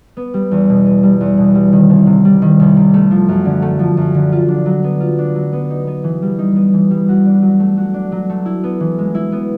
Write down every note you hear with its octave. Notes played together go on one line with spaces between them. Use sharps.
B3
G3
E2
B2
B3
G3
E2
B2
G3
D#3
C2
C3
G3
D#3
C2
C3
A3
F3
F#2
D3
A3
F3
F#2
D3
F4
D4
F#3
B3
F4
D4
F#3
B3
D#4
B3
E3
G3
D#4
B3
E3
G3
F#4
D4
F#3
A3
F#4
D4
F#3
A3
E4
B3
E3
G#3
E4
B3